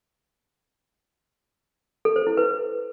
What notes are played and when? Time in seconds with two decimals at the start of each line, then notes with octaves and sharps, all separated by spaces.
2.05 A4
2.16 C5
2.27 E4
2.37 B4